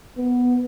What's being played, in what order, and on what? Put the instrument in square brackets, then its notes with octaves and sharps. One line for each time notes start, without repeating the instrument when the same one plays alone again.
[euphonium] B3